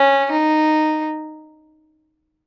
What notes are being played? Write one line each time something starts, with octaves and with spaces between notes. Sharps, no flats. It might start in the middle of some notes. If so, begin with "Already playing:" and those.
Already playing: C#4
D#4